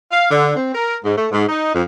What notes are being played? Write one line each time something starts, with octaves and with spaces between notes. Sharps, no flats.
F5
D3
C4
A#4
G#2
A3
G#2
D#4
F2